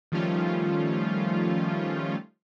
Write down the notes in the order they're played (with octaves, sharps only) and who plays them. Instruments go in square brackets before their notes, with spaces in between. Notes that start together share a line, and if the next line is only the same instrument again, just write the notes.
[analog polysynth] D#3 F3 G3 A3 C#4 F4